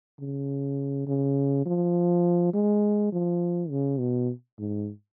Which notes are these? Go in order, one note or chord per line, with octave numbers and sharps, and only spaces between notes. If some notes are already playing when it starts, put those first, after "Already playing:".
C#3
C#3
F3
G#3
F3
C#3
B2
G#2